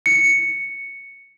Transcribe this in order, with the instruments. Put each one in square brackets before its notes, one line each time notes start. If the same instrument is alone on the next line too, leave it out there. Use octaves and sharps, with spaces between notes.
[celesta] C#7